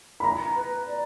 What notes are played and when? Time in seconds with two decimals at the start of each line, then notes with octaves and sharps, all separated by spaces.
0.20 B5
0.24 A#5
0.56 B4
0.87 D5